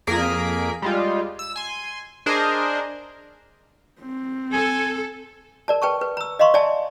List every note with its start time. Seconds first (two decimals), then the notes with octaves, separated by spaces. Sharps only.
0.07 F2 A#3 G#4 A#4 B6 D7
0.82 G3 G#3 F4
1.39 E6
1.56 G#5 C6
2.26 D4 G#4 A#4 C5 D#5
4.01 C4
4.52 A4 G#5
5.68 A#4 D5 A5
5.82 B4 G5 A5 C#6
6.01 B4
6.17 A#5 E6
6.39 D#5 F5 A#5 C6 C#6
6.54 D5 E5 G#5 A5